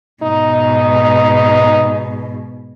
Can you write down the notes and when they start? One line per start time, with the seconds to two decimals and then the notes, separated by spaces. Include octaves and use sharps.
0.23 G#2 B2 D#4